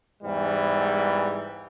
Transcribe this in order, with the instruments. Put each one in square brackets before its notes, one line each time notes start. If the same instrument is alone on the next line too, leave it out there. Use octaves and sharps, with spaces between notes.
[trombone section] E2 G#2 E3 G3